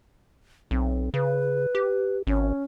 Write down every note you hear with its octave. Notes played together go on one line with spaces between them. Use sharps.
B1 C4
C#3 B4
G4
G#1 C#4